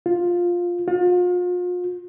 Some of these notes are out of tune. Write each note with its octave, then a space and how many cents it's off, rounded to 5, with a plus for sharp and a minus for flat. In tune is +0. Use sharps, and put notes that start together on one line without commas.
F4 +10
F4 +40